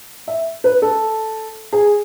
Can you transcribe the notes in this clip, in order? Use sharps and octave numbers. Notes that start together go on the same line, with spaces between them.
E5
B4
A4
G#4